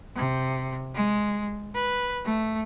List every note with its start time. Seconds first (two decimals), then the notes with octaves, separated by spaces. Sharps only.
0.16 C3
0.95 G#3
1.74 B4
2.25 A3